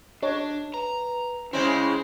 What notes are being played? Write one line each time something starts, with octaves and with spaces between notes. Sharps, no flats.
D4 C#5 D#5
B4 A#5
C#3 G#3 C4 C#4 E4